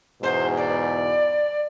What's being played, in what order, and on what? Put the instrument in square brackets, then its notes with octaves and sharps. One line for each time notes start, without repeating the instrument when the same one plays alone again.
[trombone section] E2 G#2 B2 [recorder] C5
[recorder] D5